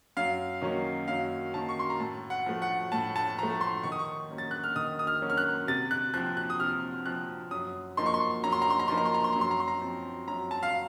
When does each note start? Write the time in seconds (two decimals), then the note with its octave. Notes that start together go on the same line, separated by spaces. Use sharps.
0.17 F#2 F5
0.62 D#3 F#3 A#3 C#4
1.08 F#2 F5
1.54 D#3 F#3 A#3 C#4 A5
1.69 C#6
1.79 C6
1.90 A#5
2.00 A2 A5
2.30 F#5
2.46 F3 A3
2.62 F#5
2.92 A2 A5
3.16 A5
3.39 F3 A3 A#5
3.61 C6
3.84 D#3 C#6
3.92 D#6
3.99 C#6
4.31 F#3 A#3 C#4
4.38 A6
4.51 F#6
4.64 F6
4.75 D#3 D#6
4.99 D#6
5.07 F6
5.22 F#3 A#3 C#4
5.30 F6
5.38 F#6
5.67 C3 A6
5.91 F#6
6.14 F3 C4 F#6
6.37 F#6
6.50 D#6
6.59 C3 F6
7.06 F3 C4 F#6
7.51 F#2 D#6
7.97 F3 A#3 D#4 C6
8.06 C#6
8.14 C6
8.44 F#2 A#5
8.52 C6
8.62 A#5
8.70 C6
8.79 A#5
8.88 F3 A#3 D#4 C6
8.98 A#5
9.05 C6
9.14 A#5
9.24 C6
9.33 F#2 A#5
9.41 C6
9.51 A#5
9.60 C6
9.68 A#5
9.81 F3 C4
10.28 F#2 A#5
10.51 A5
10.63 F5